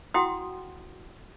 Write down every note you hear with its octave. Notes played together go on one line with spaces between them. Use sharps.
E4 F#4 F#5 G5 C6 D#6